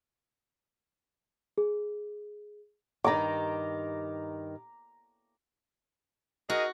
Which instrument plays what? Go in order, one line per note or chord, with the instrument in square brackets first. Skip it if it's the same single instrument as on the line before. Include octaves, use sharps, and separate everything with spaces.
[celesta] G#4
[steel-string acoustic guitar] G2 D#3 [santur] A#5 D6
[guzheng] F#4 [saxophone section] G#4 A#4 D#5